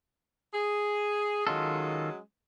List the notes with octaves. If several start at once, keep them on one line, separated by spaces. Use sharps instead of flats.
G#4
D#3 F#3 G#3 C#4 F4 A4